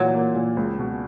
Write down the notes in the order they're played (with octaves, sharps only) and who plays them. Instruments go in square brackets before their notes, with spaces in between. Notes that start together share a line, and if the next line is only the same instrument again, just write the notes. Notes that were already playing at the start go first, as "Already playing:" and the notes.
Already playing: [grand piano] A#2 E3 [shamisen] F#3
[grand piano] A#3
A#2
C#2
B2